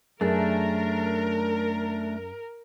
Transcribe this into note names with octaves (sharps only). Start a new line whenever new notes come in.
F#2 A3 D4 G#4 A#4